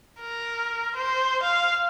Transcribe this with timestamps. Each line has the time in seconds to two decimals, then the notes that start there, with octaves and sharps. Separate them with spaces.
0.20 A#4
0.96 C5
1.42 F5